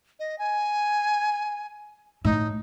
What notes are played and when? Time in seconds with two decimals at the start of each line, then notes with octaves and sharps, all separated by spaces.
0.19 D#5
0.39 G#5
2.24 A2 D#4